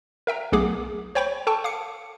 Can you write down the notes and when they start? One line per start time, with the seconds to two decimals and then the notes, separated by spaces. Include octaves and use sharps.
0.27 A#4 E5 G5 A#5
0.52 B1 A3 B3 G#4 D6
1.15 C5 C#5 G5 B5 C#6
1.47 A4 G5 A5 C#6
1.64 F5 D6 C#7